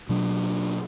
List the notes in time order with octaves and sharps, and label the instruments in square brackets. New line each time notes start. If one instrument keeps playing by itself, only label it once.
[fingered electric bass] B2 F#3 D4